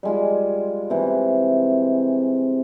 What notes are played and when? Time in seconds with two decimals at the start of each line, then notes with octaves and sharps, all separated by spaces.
0.03 G3 G#3 F4
0.90 C3 E3